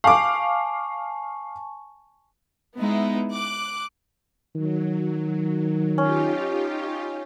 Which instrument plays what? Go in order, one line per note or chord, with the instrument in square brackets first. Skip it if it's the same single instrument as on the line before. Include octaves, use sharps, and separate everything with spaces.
[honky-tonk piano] F5 D6 [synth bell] G#5 A5 C#6
[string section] G#3 B3 D#4 E4
D6 F#6
[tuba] D#3 [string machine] F#3
[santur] C#4 [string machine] D#4 F4 G4